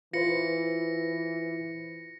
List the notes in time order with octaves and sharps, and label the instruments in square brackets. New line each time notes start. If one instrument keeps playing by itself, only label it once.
[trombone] E3 [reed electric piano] F4 B4 C5 [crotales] A#6 C#7